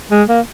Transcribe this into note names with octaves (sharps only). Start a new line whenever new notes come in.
G#3
A#3